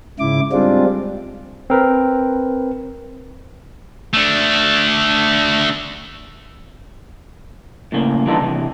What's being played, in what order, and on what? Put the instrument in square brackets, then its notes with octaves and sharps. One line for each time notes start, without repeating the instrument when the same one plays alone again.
[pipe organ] G#2 C#3 E4 D6
G3 G#3 C4 D4 F4
[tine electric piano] C4 A#4 B4
[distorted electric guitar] A3 D4
[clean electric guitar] A2 C#3 A#3
E3 G3 D4 D#4 F4 A4
C3 E3